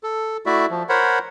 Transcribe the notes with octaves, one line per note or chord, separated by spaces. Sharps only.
A4
A3 E4 F#4 D5 E5
F3
A#4 C5 C#5 F#5 B5